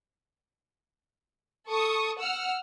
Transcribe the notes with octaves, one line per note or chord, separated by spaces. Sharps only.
A4 C#6 D#6
F#5 E6 F6